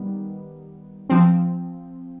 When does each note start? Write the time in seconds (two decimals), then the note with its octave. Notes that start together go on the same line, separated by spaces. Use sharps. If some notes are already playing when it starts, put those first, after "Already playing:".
Already playing: D#3 G3 B3
1.09 F3 C4